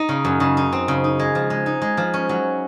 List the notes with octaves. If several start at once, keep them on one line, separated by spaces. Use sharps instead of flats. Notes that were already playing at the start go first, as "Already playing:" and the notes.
Already playing: D#4
C#3
F#2
C#3
D#4
C4
C#3
D#4
G#3
F3
G#3
D#4
G#3
F3
C#4
F#3